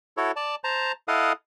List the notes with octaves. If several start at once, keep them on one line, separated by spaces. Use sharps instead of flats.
E4 F#4 A4 C#5
D5 A5
C5 A5 A#5
E4 A4 D#5 F5 F#5 D#6